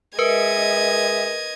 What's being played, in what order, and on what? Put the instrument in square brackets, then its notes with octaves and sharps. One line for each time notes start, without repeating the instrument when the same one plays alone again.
[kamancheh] G#3 E5 [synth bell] A#4 B4 [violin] D#5 G#6